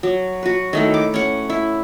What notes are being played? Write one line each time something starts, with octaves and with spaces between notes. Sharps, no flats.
F#3
F#4 B4
D#3 A3 E4
D6
C#4 F#5
E4